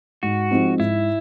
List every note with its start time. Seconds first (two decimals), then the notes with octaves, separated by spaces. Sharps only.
0.23 G#2 F#4
0.50 F3 G#3 C4 D#4
0.79 G#2 E4